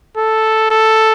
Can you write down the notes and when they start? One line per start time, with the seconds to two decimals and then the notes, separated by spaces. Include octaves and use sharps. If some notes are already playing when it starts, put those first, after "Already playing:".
0.17 A4
0.71 A4